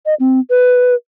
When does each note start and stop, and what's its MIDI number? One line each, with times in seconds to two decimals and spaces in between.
0.06 0.14 75
0.20 0.40 60
0.50 0.94 71